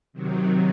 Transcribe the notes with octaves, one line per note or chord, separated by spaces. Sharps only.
C3 D#3 F#3